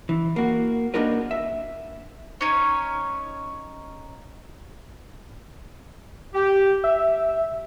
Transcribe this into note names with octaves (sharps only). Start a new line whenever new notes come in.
E3
A#3 F#4
A#3 D4 D#4 F#4 A#4 B4
E5
C#4 D#4 C#5
G4
E5